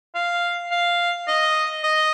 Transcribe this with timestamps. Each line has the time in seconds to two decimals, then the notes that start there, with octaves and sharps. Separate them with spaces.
0.15 F5
0.71 F5
1.28 D#5
1.83 D#5